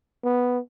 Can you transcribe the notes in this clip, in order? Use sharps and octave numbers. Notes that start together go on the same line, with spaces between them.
B3